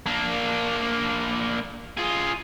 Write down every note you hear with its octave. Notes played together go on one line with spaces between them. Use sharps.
A#3 D4
F4 G#4